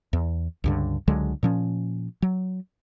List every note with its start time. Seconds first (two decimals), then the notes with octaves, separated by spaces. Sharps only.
0.13 E2
0.64 C#2 G2 D3
1.07 C#2 D3 F#3 G#3
1.43 A#2 F3 C#4
2.22 F#3